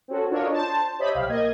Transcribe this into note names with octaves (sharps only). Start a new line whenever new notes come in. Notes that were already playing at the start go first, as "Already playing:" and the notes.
C4 C#4 F#4 A4
D4 F4 A4 A#4 C#5 D#5
C5 A5
G4 C5 C#5 D#5 E5 B5
B1 G4 F5
A#3 D#5 G#6